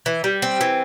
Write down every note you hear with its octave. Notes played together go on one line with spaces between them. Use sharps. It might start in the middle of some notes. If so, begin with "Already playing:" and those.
E3
G3
C4
E3